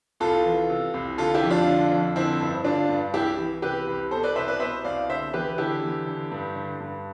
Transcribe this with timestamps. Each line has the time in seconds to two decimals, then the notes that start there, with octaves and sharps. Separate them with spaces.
0.20 C2 F4 A4
0.45 E3
0.70 C3
0.94 C2
1.18 D3 F4 A4
1.34 E4 G4
1.42 F2
1.50 D4 F4
1.67 D3
1.91 F2
2.16 D3 C4 E4
2.40 G2
2.64 D3 D4 F4
2.89 G2
3.14 C2 E4 G4
3.38 E3
3.62 C3 G4 B4
3.87 C2
4.11 B2 A4 C5
4.23 B4 D5
4.36 C2 C5 E5
4.48 B4 D5
4.60 B2 C5 E5
4.84 C2 D5 F5
5.09 D3 C5 E5
5.33 E2 G4 B4
5.58 D3 E4 G4
5.82 E2
6.07 D3
6.31 G2
6.55 D3
6.81 G2